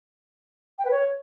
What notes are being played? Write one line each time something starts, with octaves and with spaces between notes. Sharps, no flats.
G5
B4
C#5